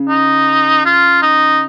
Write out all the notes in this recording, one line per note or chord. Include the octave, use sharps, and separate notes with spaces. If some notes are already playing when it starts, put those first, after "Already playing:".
Already playing: C#3
D#4
F4
D#4